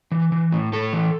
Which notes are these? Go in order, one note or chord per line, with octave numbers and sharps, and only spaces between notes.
E3
E3
A2
A2 A4
E3